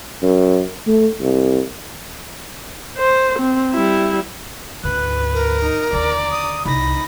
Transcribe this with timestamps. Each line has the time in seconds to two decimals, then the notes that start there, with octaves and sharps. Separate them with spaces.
0.22 F#2
0.87 A3
1.21 C2
2.98 C5
3.39 C4
3.73 G3 E4
4.84 D2 G#2 B4 F#6
5.33 A#4
5.63 D#4
5.92 D#2 D3 D5 A#5
6.31 D#6
6.66 C2 D#4 B5 A#6